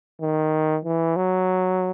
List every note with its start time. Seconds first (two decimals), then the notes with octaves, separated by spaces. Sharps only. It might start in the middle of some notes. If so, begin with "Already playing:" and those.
0.21 D#3
0.85 E3
1.16 F#3